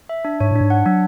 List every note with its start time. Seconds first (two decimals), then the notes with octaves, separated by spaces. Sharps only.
0.09 E5
0.25 D4
0.40 G#2 C#5
0.51 A2 D4
0.61 G#2
0.70 F#5
0.86 F#3 D4